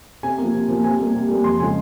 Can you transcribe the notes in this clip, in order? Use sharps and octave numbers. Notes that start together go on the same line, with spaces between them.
C3 G#5
F3 A#3
C3
F3 A#3
C3 G#5
G3 A#3
C3
G3 A#3
F2 C6
C#3 F3 G#3 G#5